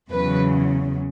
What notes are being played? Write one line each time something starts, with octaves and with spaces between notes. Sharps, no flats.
E2 C#3 F#3 B4